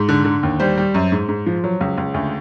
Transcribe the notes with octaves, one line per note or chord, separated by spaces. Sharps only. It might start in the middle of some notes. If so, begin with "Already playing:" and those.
Already playing: G#2
D3
D3
D#2
G3 C5
G3
F#2
G#2
G#2
F3
F#3
C#2
C#2
D2